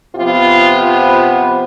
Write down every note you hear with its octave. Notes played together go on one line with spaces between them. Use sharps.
C3 F3 B3 F4